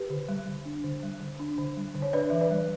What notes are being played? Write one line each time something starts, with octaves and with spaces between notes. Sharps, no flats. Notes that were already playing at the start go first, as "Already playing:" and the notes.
Already playing: G4 B4
D3
G3
D3
D4
D3
G3
D3
D4
D3
G3
D3
C#5
D4 B4 D5
E3 E5
B4 D5
G3